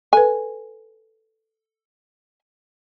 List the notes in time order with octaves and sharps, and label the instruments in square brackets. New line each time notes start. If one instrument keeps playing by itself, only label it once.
[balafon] A4 B4 [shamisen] G#5